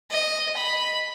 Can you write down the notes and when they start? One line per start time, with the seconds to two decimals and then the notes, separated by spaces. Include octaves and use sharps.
0.11 D#5
0.57 B5